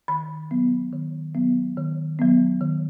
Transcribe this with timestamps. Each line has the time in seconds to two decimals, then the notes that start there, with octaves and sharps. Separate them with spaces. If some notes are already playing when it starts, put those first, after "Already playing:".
0.08 D#3 B5
0.51 F#3 B3
0.92 D#3
1.35 F#3 B3
1.77 D#3
2.19 F#3 B3
2.61 D#3